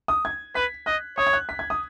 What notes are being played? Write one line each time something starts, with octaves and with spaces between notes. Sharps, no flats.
D#6
G#6
B4 B6
D#5 F#6
C#5 D#6
G#6
F#6
B6
G#6
D#6